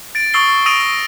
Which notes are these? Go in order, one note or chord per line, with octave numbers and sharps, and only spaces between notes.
A6 D7
C#6 D#6 E6 A6 C7 G7
D#6 E6 A#6 D7 D#7 F7